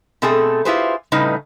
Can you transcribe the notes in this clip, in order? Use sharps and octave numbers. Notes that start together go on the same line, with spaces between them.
B2 A3 C4 G#4 A4
E4 F4 G4 G#4 B4 C5
A2 C#3 G3 D#4 B4 D#5